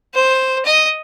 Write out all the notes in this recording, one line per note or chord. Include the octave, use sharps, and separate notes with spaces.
C5
D#5